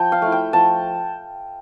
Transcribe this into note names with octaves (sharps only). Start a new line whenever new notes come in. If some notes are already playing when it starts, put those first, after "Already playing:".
Already playing: F3 G5 A5
F5
A3 E4
G5
F3 A5